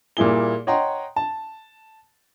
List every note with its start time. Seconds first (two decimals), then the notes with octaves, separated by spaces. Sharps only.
0.17 A#2 G3 A#3 E4 G#4 G7
0.67 C#5 D#5 F#5 G5 A#5 C6
1.16 A5